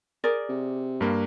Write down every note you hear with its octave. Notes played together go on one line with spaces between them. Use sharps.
G#4 A#4 D5
C3
G2 A#3